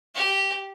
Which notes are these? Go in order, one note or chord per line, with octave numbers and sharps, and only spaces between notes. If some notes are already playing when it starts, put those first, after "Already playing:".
G4